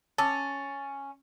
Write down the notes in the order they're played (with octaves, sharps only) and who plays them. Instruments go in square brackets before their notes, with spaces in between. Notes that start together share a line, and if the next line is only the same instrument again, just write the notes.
[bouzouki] C#4 [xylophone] A5 D6 E6 [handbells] A6